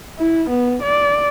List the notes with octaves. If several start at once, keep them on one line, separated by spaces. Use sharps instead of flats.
E4
B3
D5